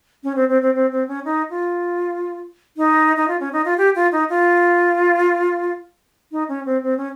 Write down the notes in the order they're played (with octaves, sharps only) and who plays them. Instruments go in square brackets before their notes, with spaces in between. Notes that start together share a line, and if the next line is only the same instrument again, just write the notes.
[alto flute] C#4
C4
C4
C4
C4
C4
C#4
D#4
F4
D#4
D#4
F4
C#4
D#4
F4
G4
F4
D#4
F4
D#4
C#4
C4
C4
C#4